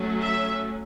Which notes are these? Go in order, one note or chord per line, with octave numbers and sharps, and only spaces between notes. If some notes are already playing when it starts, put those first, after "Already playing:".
Already playing: F#3 A3 C#4
E5